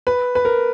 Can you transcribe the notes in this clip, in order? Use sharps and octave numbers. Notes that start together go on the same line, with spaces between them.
B4
B4
A#4